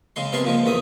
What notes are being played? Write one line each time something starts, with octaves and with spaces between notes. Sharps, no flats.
C#3 G#3 C6
C3 B3 G#4 A#4 A5 C6
A#2 F3 G#3
E2 D#3 A3 D#6